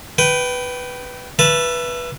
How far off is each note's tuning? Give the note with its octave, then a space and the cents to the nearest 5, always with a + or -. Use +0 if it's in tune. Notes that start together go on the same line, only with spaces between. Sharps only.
B4 +5 G5 -20
B4 -10 E5 +25 A5 +0